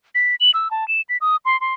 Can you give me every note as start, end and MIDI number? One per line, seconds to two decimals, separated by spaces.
0.15 0.35 95
0.40 0.51 102
0.54 0.71 88
0.71 0.87 81
0.88 1.01 100
1.09 1.17 95
1.21 1.36 87
1.45 1.59 84
1.61 1.74 84